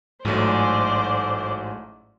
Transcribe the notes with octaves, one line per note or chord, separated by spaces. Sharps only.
A1 G#2 F#3 A3 C5 D5